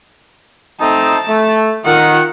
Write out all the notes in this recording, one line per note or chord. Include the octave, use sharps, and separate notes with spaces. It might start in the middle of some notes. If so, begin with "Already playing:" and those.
A3 C4 D#4 A5
A3
D#3 F4 F#5